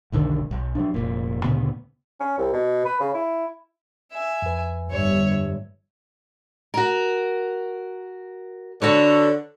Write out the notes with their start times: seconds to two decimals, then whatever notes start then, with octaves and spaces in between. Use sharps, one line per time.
0.12 F1 B1 D3 D#3
0.51 B1
0.75 F#3 D4
0.94 F1 A#2
1.44 D2 A#2 C#3 B3
2.20 C#4
2.38 C2
2.53 B2
2.85 B4
3.00 C#3
3.14 E4
4.12 E5 G#5
4.42 F2 B4
4.90 G1 C#5 E5
6.74 F#4 A#4
8.82 D3 D4 F#4 A4 B4 C#5